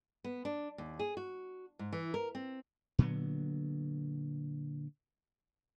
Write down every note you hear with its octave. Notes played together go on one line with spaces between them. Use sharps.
B3
D4
D#2
G#4
F#4
G#2
E3
A#4
C4
A#2 D3 F#3 B3